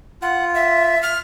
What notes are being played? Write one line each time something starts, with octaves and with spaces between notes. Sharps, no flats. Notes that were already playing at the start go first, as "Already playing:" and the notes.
F4 F#5
E5
F6